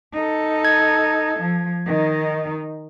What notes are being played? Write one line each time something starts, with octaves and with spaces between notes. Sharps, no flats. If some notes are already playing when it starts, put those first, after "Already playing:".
D#4 A4
G#6
F3
D#3 D#4